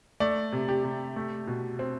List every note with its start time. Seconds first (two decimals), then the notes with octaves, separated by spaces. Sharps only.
0.20 A3 D5
0.53 C3
0.69 G4
0.84 C3
1.16 A3
1.47 B2
1.79 C4